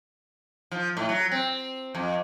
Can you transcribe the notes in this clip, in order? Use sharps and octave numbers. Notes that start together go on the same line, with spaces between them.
F3
A2
F#3
C4
F2